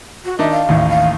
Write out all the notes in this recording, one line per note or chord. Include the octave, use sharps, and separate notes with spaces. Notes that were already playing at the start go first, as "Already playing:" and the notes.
F#4
D#3 D4 D#4 E5
F5
A1 D#2 A2
F5